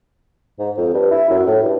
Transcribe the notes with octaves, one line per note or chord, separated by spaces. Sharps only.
G#2
F2
G2
E4
F#2
A2
G2